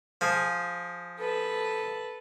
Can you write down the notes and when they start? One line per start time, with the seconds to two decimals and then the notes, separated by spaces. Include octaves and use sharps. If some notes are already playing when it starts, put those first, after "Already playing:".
0.21 F3 G#4
1.17 A4 B4